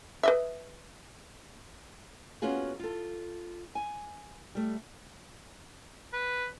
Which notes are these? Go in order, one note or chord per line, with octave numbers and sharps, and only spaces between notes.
B4 D#5 E5
A#3 B3 C#4 F4 F#4 G#4
F4 A4
G#5
G3 A3
B4